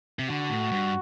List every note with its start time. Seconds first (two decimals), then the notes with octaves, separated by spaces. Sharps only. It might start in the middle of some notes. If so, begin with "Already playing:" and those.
0.19 C3
0.29 D3 F#4
0.50 A2
0.71 G2